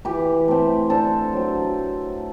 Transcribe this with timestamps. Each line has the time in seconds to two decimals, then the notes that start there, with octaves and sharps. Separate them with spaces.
0.05 E3 G4 B4
0.48 A3 C4
0.90 D3 A4 C5
1.33 F#3 C4